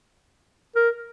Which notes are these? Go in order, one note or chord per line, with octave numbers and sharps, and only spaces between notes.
A#4